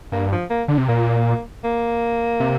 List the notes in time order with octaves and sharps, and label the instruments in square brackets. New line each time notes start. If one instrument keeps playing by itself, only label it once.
[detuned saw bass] G2 [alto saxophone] A#3
[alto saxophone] F3
A#3
[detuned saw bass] D3
C3
[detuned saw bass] A#2 [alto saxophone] A#3
[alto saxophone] A#3
[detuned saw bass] C3